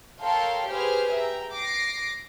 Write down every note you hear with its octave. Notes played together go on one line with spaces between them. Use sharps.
A4 A#4 C#5 F5 G5 C6
G4 G#4 B4 C5 F6
E5 G5 A#5
D6 A#6 C7 D7